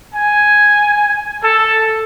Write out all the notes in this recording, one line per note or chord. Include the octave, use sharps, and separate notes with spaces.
G#5
A4